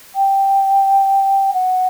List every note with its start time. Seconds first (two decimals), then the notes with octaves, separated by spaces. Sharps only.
0.15 G5
1.53 F#5